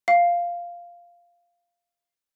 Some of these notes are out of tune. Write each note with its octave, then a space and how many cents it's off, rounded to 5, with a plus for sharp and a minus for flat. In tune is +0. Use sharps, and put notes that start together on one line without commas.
F5 -5